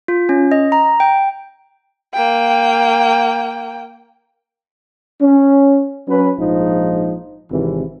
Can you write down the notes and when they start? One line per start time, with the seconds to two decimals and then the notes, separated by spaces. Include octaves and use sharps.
0.08 F4
0.29 C#4
0.52 D#5
0.72 A#5
1.00 G5
2.13 A#3 G5
5.21 C#4
6.08 F#3 C#4 B4
6.39 A#1 G#2 F3 D#4
7.51 G#1 C3 E3